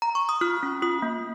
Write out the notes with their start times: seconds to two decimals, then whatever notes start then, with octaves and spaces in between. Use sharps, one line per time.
0.02 A#5
0.15 C#6
0.29 D#6
0.41 F4 F6
0.63 C#4
0.82 F4 D#6
1.02 A#3